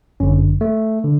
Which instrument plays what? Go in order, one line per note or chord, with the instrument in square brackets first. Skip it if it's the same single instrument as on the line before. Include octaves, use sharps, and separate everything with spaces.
[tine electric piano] G1 F#2 D3 C#4
A3
D3